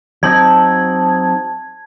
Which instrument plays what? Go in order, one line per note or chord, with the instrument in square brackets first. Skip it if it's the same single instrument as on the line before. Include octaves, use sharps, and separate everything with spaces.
[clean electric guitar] F#3 C4 D#4 [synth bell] A5 G#6